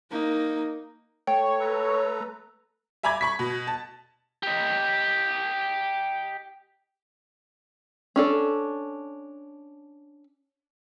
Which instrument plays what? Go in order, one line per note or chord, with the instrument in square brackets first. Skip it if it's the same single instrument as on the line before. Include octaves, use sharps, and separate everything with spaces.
[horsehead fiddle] A#3 D#4
[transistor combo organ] A3 [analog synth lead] C#5 [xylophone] G5
[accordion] A4 B4 A#5
[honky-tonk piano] E5 G#5 A#5 B5 D6 G#6
B5 C#6 B6
B2
A5
[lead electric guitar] G4 D#5
[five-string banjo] C#4 D4 A4